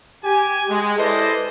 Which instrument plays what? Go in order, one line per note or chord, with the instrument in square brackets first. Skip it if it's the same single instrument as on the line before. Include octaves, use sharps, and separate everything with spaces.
[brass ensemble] G4 G#5
G#3
E4 A4 B4 C5 D5 D#5